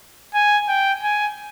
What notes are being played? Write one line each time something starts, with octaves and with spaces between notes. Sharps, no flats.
G#5
G5
G#5